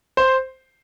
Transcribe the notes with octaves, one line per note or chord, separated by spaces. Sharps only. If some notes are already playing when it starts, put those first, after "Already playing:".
C5